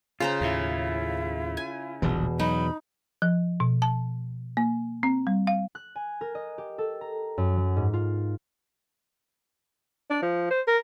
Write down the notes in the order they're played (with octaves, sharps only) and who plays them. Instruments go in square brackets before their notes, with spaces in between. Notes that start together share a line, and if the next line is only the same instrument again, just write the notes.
[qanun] C#3 C5 A#5 [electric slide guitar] F4
[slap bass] D#2 A2 [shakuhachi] E4
[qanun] G#5
[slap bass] D#1 A#1 [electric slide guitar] E2 B2
[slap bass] F#3 [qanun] D#4 [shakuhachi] B5
[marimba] F3
B2
A5
A#3
C4
G3
F5
[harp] F#6
G#5
A#4
D#5
G4
A4
A#5
F#2
F#3
G#2
F4
[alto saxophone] D4
F3
C5
A#4